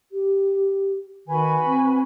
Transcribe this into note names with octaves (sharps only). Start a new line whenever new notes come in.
G4
D#3 F#4 B4 G#5
C4